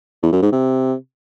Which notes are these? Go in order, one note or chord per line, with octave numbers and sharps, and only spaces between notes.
E2
F#2
G#2
C3